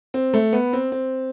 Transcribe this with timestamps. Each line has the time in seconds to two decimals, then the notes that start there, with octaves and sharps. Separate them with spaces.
0.14 C4
0.34 A3
0.53 B3
0.73 C4
0.92 C4